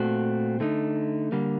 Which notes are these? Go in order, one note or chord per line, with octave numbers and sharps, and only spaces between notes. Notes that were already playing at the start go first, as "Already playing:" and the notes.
Already playing: A#2 A3 C4 F#4
D3 A3 D#4
D3 G3 A#3